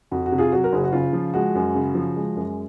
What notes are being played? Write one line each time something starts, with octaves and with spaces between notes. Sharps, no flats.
F2 F#4
F#4
C3
F4 G#4
F#3 F#4
A#4
F#1 G#4
F#4
C#3 F4
F3
G#3 F#4
F#2
C#3
F3
G#3
F#2